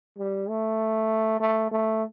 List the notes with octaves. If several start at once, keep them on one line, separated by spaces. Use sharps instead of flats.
G3
A3
A3
A3